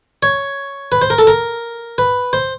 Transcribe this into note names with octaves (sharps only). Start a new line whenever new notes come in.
C#5
B4
C5
A#4
A4
A#4
B4
C5